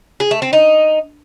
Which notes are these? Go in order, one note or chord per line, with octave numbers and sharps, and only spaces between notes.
G#4
A3
C4
D#4